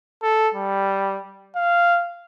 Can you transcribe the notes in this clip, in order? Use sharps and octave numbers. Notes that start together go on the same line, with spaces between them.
A4
G3
F5